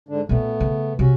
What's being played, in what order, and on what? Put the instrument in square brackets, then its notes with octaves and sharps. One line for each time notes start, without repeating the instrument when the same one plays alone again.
[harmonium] G#2 D3 D4
[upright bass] A#2 C#4 [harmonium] A3 B3
[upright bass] C#3
[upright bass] C3 [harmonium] C#4 F#4